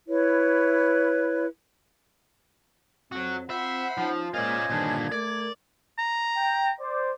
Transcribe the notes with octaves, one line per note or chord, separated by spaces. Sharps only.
E4 B4 C#5
F2 F#3 C4 F#4
C4 F4 C5 E5 F#5 B5 C6
F3 C#4 D#4
G#3 A#3 C#4 F4 C5 D5 D#5 G#6
G2 A#2 D3 D#3 D4
A3 A#4 D5 D6
A#5
G5
C5 D5